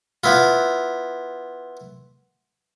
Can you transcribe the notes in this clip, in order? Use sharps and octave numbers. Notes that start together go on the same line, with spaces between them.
B3 E4 F4